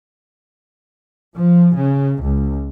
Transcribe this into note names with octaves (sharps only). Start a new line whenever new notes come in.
F3
C#3
C#2